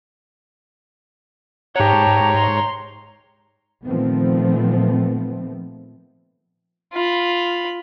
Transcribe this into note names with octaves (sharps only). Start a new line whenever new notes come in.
G#2 G4 C#5 A5 A#5
C6
A#2 D#3 F3 A3 B3 C4
F4 B5